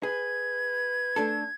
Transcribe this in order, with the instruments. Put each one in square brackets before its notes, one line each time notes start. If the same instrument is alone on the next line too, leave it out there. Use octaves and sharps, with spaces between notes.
[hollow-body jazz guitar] G#4 [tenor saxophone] B4 [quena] G#6
[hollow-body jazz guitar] A3 D4 A4